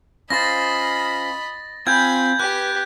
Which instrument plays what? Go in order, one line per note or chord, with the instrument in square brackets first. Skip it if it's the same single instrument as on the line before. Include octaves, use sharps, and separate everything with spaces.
[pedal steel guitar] C#4 F4 C5 [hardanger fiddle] D#5 B5 [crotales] A6 A#6
[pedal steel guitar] C4 F4 G5 [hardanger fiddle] G#5 B5 [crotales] G6 G#6
[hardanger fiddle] G4 [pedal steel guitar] B4 [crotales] F#6